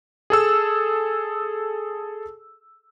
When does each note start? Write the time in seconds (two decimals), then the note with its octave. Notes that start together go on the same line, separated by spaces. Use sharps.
0.30 G#4 A4 E6